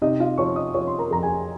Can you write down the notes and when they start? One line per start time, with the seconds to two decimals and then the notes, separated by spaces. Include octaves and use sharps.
0.02 C3 D#4 D#5
0.20 F4 F5
0.38 F3 C#5 C#6
0.56 D#5 D#6
0.74 F3 C#5 C#6
0.87 C6
0.99 A#4 A#5
1.11 F2 A#5
1.23 G#4 G#5